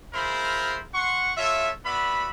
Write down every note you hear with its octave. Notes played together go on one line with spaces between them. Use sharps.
F4 G#4 A#4 C5 E5 B5
F#5 C6 C#6
F4 A4 C#5 E5
B3 F#4 D5 E5 B5